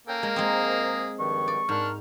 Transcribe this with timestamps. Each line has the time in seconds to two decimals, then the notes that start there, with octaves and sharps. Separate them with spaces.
0.08 A#3 C#4 A4 G5
0.23 G#3 A#4
0.36 G#2 G#3 C4 G#4 A#5
1.19 G2 D#3 F3 C#6
1.48 D5
1.69 G#2 D4 A#4 F6